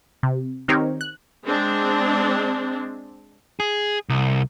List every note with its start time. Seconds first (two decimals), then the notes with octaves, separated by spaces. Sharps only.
0.23 C3
0.68 D#3 C4 D#4 G4 A#4 C#5
1.01 F#6
1.46 G#3 C4 D4
3.60 G#4
4.09 C2